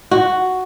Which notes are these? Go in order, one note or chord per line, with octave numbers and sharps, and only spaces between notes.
F#4